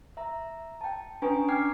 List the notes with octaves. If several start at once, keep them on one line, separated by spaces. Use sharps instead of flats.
E5 A#5
G5 A5
C#4 D4 B4 G#5 A#5 C#6
G5 D6 F6 G#6 C7